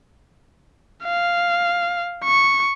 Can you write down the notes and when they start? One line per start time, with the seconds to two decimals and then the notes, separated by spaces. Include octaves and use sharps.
1.05 F5
2.25 C#6